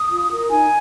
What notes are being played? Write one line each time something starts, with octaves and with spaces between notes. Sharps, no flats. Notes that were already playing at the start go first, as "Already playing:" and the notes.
Already playing: D#6
F4
A#4
D#4 G#5